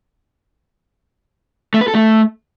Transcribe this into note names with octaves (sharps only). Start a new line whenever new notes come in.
A3
B4
A4
A3